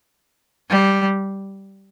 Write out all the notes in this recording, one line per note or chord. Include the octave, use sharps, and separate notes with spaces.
G3